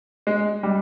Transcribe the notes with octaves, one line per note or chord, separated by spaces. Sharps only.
G#3
G3